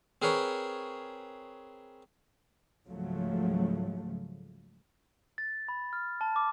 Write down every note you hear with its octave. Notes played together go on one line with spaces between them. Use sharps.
C4 G#4 A#4 B4 C#5
C#2 G#2 C#3 F3 F#3 A3
A6
B5
F6
A5
D6